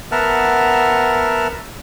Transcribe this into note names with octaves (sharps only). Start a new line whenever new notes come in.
B3 A#4 E5 F#5 A5 F6